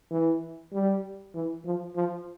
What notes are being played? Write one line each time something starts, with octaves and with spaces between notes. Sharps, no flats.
E3
G3
E3
F3
F3